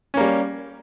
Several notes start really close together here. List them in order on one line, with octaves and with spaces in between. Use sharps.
C#4 A#3 G3